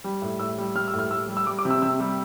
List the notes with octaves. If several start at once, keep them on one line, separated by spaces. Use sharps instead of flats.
G3
A2
A2 E6
G3
G3 F6
E6
A2
F6
A2 E6
G3
E6
G3 D6
D6
C3
E6
C3 E6
G3